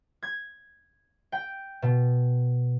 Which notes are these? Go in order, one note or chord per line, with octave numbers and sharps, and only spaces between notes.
G#6
G5
B2